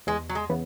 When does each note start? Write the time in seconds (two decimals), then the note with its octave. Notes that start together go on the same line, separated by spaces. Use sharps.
0.07 E2 G#3
0.29 F#3
0.35 G#3
0.50 C#3 E3 B3